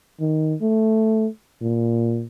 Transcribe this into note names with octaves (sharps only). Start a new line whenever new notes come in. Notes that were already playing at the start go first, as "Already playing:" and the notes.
D#3
A3
A#2